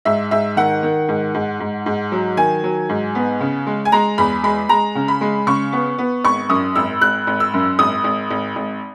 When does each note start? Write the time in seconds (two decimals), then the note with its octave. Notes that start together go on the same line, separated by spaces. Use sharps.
0.05 G#2 E5
0.31 G#2 E5
0.57 D#3 F#5
0.83 D#3
1.09 G#2
1.34 G#2
1.60 G#2
1.86 G#2
2.12 F#3
2.37 D#3 G#5
2.63 F#3
2.89 G#2
3.15 B3
3.41 C#3
3.67 G#3
3.85 G#5
3.92 G#3 A#5
4.18 E2 B5
4.43 G#3 B5
4.69 G#3 A#5
4.95 C#3
5.08 B5
5.21 G#3
5.47 C#3 C#6
5.72 B3
5.98 B3
6.24 G#1 C#6
6.49 F#2 D#6
6.75 G#1 E6
7.01 G#1 F#6
7.27 G#1
7.40 E6
7.54 F#2
7.79 G#1 D#6
8.04 G#1
8.31 G#1
8.56 G#1